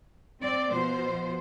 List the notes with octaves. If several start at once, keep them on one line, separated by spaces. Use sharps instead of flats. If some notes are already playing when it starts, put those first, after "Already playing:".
C4 D5
B2 F3 C5